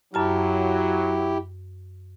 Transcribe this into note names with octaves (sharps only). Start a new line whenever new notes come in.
F#2 F#3 E4 G4 A5 F6